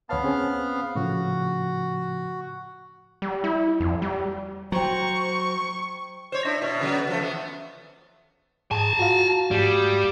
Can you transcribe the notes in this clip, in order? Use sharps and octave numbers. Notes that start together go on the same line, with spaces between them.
D2 B3 C#5 F5 A5
C4 C#4 G#4
A2 C#3 F3 F#4
G3
E4
F2
G3
F#3 C5 G5 A#5 C#6
C5 C#5
D4 E4
B2
C#3 F#3 B3
F3 A3
E2 B3
G#2 G#4 G#5 A5
F4 F#4 F5
G#2 G3 A3